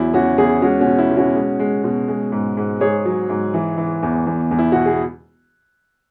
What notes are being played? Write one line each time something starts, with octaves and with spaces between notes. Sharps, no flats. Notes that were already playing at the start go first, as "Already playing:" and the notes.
Already playing: E2 F#3 E4
E2 C#4 F#4
E2 E4 G#4
G#3 C#4 F#4
C#4 F#4
B2
E4
B2
C#4 F#4
G#3
G#3
B2
G#3
G#2
G#2
G#2 G#4 C#5
F#3
G#2
E3
E3
E2
E2
E2
E4
B2 F#4
G#4